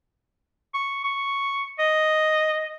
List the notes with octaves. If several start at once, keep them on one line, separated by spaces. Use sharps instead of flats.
C#6
C#6
D#5